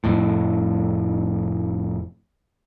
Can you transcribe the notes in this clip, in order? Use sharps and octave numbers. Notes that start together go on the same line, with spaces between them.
F1 F2 A2